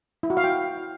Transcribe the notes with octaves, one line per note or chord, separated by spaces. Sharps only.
E4
F#4
F5
G5